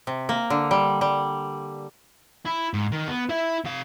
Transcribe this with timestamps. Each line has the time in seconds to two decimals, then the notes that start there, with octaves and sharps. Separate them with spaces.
0.07 C3
0.29 A#3
0.50 D3
0.71 G3
1.01 G3
2.45 E4
2.74 G#2
2.92 D#3
3.08 B3
3.29 E4 E5
3.65 C3 F5